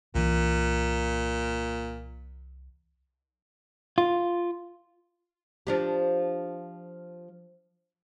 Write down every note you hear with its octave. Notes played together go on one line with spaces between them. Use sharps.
C2 A#2 E3
F4
F3 D4 G4